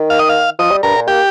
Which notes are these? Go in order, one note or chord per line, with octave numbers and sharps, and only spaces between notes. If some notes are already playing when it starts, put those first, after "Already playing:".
Already playing: D#3
F5
D#5
F5
F3 D#5
G3
G2 A#4
A#2
A#3 G4